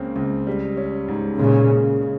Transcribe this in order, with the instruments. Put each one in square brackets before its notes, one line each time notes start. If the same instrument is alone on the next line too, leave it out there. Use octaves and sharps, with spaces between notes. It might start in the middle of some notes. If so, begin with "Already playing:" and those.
Already playing: [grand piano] C#2 C#3 A#3 C4
C#2
G3
C#4
G#2
[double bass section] A#2 C#3 [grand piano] G#3
[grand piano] C#3
C#3